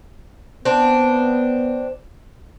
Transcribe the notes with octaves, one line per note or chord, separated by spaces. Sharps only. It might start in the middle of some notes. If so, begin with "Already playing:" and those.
B3 C4 D4